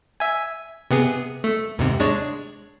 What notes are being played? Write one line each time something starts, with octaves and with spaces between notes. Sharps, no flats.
E5 G#5
C3 B3 G#4
A3
D#2 G#2 C3
G#3 D4 C#5